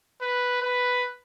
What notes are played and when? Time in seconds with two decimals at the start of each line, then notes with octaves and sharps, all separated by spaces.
0.21 B4
0.62 B4